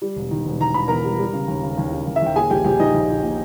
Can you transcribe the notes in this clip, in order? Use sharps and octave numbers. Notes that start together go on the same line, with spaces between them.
G3
E1
D#3
E1
D#3 A#5
E1 B5
E2 A#4 A#5
G3
G3
C#3
D#2
C#3
D#2
C#3
D#2
E5
D#2 G5
A#2 G#4 G#5
A#1 G4 G5
A#1 G4 G5
A#1 D#4 D#5
A#1
A#1
A#2